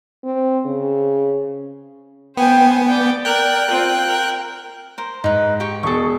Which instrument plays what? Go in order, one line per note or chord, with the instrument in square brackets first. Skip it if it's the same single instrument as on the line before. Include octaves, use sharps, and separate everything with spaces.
[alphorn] C4
C#3
[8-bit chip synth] B3 [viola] C5 G#5 [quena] G5
[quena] D5 [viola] G5 D6
[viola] A#4 [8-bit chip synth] G5 F#6
[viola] C4 F4
A#4
[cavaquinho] A#4 C5
[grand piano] G#2 [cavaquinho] D#4 B4
[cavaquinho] G4 G5 C#6
[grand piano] E1 B2 G#4 [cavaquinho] A4 C#6